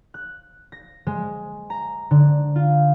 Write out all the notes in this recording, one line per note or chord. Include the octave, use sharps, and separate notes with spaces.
F#6
A#6
G#3
A#5
D3
F4